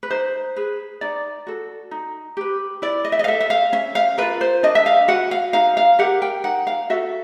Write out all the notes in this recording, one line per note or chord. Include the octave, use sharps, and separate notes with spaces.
B4
D#4 C5
G#4 B4
D#4 D5
F#4 A4
D#4
G4 B4
E4 D5
D#5
E5
D#5
F5
A4 E5
E5
F5
C#4 E5
F5
F4 A#4 B4
C5
D4 D#5
E5
F5
F#4 B4 F#5
F5
D#4 F5
F5
G4 A#4 F#5
G5
D#4 F#5
F5
F#4 A4 E5